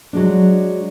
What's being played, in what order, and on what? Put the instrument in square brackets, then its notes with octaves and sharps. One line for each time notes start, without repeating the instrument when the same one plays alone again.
[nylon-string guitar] F#3 G#3 D4